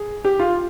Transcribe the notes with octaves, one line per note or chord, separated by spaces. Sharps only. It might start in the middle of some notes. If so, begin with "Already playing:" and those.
Already playing: G#4
G4
F4